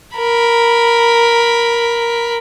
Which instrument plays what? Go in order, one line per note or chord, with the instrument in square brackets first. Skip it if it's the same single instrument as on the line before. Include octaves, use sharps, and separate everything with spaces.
[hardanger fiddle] A#4 B5